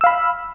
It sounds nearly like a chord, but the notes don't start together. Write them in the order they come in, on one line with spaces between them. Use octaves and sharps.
E6 F5 B5